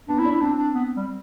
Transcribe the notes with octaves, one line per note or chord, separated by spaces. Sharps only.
B3 D4
C4 E4
D4
E4
C4 D4
D4
B3
G3